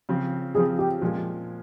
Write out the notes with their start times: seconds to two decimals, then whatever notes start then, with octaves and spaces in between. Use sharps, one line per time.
0.09 C#3 F3 C4
0.55 C#3 F3 C4 G#4
0.79 G4
1.02 A#2 F3 G#3